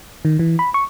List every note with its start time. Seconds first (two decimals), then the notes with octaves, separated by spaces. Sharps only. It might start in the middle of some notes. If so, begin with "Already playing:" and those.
0.25 D#3
0.39 E3
0.59 B5
0.74 C#6